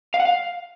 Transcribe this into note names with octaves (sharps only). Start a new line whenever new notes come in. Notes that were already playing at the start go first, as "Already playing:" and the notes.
F5
F#5
F5